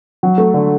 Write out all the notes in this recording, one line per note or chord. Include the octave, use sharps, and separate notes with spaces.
F#3
A3
D3